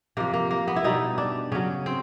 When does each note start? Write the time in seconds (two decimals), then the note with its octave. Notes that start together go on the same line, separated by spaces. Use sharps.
0.17 C3 F3 A#3
0.34 A#3
0.51 A#3
0.68 B3
0.76 E4
0.84 B2 G3 D#4
1.18 D4
1.52 C#3 F#3 C#4
1.86 C4